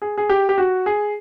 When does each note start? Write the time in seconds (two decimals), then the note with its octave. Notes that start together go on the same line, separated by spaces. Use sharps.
0.02 G#4
0.18 G#4
0.29 G4
0.49 G4
0.58 F#4
0.86 G#4